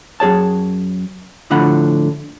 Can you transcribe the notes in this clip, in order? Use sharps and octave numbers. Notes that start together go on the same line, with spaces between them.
F#2 G#4 C#5 A5
D2 A2 D3 F3 F#5 B5